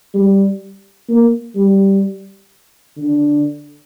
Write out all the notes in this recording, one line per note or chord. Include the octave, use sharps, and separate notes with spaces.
G3
A#3
G3
D3